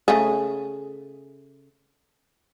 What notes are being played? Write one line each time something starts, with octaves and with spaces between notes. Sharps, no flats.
C#3 A3 G#4